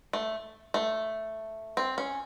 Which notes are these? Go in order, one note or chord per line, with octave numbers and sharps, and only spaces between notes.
A3
A3
C4
C#4